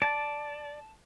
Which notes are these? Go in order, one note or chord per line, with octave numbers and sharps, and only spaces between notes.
D5 A5